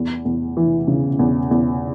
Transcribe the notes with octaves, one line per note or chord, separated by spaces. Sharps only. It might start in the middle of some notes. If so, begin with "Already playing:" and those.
Already playing: E2
E2
E3
C#3
E2
E2